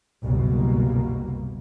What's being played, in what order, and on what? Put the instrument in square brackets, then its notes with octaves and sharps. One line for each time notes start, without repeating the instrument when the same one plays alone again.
[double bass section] F#1 C2 B2 A#3